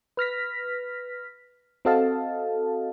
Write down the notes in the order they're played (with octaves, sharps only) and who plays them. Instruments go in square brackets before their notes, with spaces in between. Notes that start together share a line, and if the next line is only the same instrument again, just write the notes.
[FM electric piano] B4 F6 A#6 B6
C4 F#4 A4 D#5 F5 A5